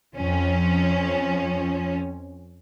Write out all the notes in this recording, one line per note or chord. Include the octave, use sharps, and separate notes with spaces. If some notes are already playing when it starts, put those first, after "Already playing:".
F2 F3 C#4